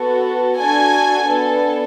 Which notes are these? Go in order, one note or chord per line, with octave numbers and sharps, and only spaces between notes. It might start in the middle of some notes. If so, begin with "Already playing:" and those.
Already playing: B3 F#4 A4
D4 F#4 A4 G#5
B3 D4 A4